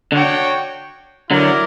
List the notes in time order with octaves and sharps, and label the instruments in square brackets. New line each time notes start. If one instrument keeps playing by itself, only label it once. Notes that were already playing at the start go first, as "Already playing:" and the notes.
[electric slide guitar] D3 [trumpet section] D4 F#4 C#5 G5
[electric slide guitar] D3 F#3 [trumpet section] E4 A#4 D5